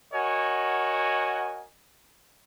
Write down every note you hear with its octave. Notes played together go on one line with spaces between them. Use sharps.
F#4 A#4 C#5 D#5 F#5 G#5